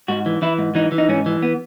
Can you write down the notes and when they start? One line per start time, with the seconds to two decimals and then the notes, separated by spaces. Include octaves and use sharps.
0.08 G#2 F#4
0.26 E3
0.42 E3 E4
0.58 G#2
0.75 E3 D#4
0.92 E3
0.98 D#4
1.09 G#2 C#4
1.26 E3
1.43 B3